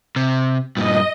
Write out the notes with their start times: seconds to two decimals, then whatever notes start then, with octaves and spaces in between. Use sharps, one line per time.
0.16 C3
0.77 G2 A#2 D#5